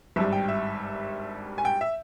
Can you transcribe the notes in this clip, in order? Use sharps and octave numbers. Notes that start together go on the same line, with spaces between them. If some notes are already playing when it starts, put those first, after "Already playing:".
G#1 G2 G3 E5
G5
E5
G#5
G5
E5